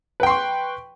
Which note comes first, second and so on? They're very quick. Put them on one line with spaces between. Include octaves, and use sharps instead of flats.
B4 G5 C6 C#6